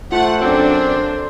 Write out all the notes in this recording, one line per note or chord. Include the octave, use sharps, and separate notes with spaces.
A3 F4 C5 F#5
F#2 C4 D4 A4